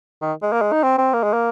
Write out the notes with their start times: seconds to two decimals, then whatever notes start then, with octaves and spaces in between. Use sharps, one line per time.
0.22 D#3
0.42 G#3
0.52 A#3
0.62 G#3
0.72 D#4
0.83 C4
0.98 C4
1.13 A#3
1.23 G#3
1.33 A#3